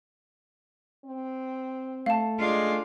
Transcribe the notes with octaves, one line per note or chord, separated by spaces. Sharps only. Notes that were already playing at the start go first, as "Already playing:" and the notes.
C4
A3 F5 A5
G#3 D4 F4